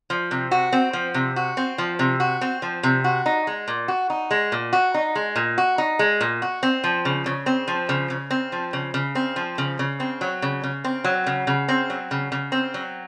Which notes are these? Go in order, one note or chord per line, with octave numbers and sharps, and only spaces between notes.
F3
C3
F#4
C4
F3
C3
F#4
C4
F3
C3
F#4
C4
F3
C3
F#4
D#4
G#3
A#2
F#4
D#4
G#3
A#2
F#4
D#4
G#3
A#2
F#4
D#4
G#3
A#2
F#4
C4
F3
C#3
C#3
C4
F3
C#3
C#3
C4
F3
C#3
C#3
C4
F3
C#3
C#3
C4
F#3
C#3
C#3
C4
F#3
C#3
C#3
C4
F#3
C#3
C#3
C4
F#3